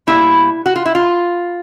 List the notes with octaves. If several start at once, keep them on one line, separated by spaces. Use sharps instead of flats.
B2 G3 A#3 E4
F#4
F4
E4
F4